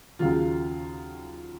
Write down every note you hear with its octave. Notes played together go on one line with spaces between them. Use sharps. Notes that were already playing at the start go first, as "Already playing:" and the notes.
D#2 C#3 F#3 F4